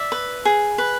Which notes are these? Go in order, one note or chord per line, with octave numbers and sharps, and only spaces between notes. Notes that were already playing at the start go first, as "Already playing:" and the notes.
Already playing: D5 E5
B4
G#4
B4